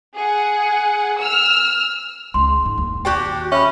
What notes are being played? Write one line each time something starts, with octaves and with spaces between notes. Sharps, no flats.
G#4 F#5
E6 F6
C#2 C6
G#2
D#2
D4 F#4 G4 G5
C#4 E5 B5